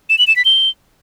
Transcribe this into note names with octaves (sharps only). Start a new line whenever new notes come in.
E7
F#7
E7
B6
G7